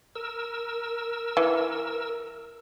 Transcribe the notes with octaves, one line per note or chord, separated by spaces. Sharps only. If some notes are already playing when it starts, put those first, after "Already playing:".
A#4 E6
E3